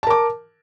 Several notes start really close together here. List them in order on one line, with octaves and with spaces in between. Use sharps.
A5 A#4 D6